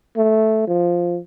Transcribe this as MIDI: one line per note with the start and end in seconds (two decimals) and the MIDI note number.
0.17 0.66 57
0.68 1.19 53